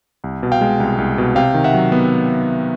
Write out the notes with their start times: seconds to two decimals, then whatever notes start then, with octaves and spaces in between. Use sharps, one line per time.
0.24 C2
0.43 B2
0.52 F5 G5
0.61 G#3
0.80 C2
0.98 C2
1.18 B2
1.36 C3 F5 G5
1.54 D#3
1.64 E5 F#5
1.74 F#3
1.92 B3